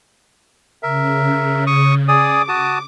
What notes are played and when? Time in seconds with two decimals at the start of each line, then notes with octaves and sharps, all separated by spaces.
0.83 C#3 A#4 E5
1.67 C#6 D#6
2.08 G#4 D5 D6 D#6
2.49 F#4 A5 D#6